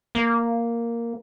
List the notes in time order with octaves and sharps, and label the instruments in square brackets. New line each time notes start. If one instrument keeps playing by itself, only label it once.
[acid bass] A#3